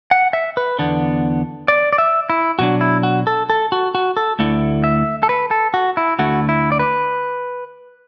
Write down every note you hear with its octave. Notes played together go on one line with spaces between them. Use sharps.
F#5
E5
B4
E2 D3 B3 D4
D5
D5
E5
E4
B2 F#3 D4 F#4
E4
F#4
A4
A4
F#4
F#4
A4
D2 D3 A3 E4
E5
A4
B4
A4
F#4
E4
D2 D3 A3 E4 F#4
E4
D5
B4